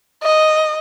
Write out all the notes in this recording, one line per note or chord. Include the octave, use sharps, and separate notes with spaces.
D#5